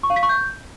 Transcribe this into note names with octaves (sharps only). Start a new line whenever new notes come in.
C#6
F5
B6
C#6
G6